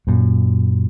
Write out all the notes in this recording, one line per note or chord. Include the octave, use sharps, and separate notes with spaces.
F#2 A#2